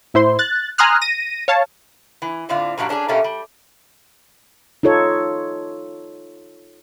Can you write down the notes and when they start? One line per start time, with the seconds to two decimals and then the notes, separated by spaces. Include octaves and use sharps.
0.14 A2 E4 C5 C6
0.39 F#6 A6
0.78 G#5 A#5 C6 D#6 F6 F#6
1.02 A#6 D#7
1.48 C#5 F5 A5
2.22 E3
2.49 A2 D3 C4 F4 D5
2.77 G2 A#2 F#3 G3 D4
2.89 C#4 D4 F#4 G#4
3.08 B2 A3 A#3 C#4 G4
3.24 G3
4.83 D#4 F4 A4 C#5